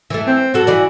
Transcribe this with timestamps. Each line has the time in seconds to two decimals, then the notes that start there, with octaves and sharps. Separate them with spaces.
0.10 E3 A3
0.27 C4
0.54 G3 F#4 A4
0.67 E3 D5